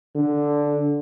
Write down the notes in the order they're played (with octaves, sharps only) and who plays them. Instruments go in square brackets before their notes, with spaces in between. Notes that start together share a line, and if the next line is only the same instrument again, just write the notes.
[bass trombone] D3